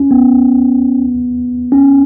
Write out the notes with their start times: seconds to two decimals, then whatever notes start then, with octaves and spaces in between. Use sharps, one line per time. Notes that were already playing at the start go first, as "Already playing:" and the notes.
Already playing: C#4
0.11 B3
1.72 C#4